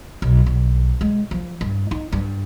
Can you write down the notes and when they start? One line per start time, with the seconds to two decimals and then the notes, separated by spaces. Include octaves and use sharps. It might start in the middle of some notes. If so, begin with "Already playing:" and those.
0.22 B1
0.46 B1
1.01 G#3
1.31 F3
1.61 G2
1.91 D#4
2.12 G2